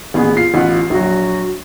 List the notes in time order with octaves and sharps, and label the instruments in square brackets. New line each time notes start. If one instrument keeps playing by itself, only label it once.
[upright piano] A1 A#2 G#4 [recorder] B3
[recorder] F4 [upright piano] C7
[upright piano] A1 B3 F#5 [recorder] F4
[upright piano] A#1 F#3 [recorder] F#4